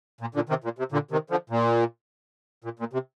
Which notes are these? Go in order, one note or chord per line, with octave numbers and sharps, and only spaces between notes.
A#2
A#2 D3
C3 D#3
A#2
C3
A#2 D3
C3 D#3
D3 F3
A#2
A#2
A#2
C3